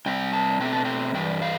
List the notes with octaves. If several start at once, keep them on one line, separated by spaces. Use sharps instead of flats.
C3 G3 C4 G5
A5
B2 A3 C4 G5
A5
G5
G2 E3 G3 G5
F5